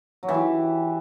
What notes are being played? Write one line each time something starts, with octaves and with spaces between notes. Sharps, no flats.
F#3
E3
G4